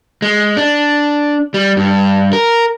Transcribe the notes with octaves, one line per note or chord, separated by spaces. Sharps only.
G#3
D4
G3
G2
A#4